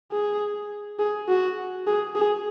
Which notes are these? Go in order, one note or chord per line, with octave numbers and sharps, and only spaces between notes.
G#4
G#4
F#4
G#4
G#4